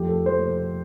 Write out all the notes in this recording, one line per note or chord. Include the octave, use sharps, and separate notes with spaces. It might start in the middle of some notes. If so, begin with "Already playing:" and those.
Already playing: F2 F3 A3 G4
A4
F3 A3 C5